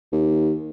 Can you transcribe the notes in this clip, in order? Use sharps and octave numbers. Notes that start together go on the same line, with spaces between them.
D#2